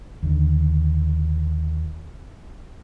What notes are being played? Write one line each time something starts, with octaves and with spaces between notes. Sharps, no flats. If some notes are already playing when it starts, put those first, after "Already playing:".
D#2 D3